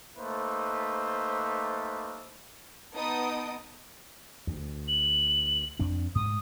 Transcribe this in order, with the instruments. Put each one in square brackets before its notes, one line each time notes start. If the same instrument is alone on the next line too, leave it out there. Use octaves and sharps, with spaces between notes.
[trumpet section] A3 A#3 D#4 B4 C5
[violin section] B3 D#4 D#5 A5 D#6 D7
[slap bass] D2
[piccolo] F#7
[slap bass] F2 C4 D4
[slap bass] G#2 [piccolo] D#6